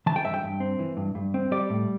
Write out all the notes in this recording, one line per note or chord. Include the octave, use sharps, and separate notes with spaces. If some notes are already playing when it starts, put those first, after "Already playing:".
E3 A5
G5
G2 E5
G5
G2
C4
E3
G2
G2
C4
G3 D5
A2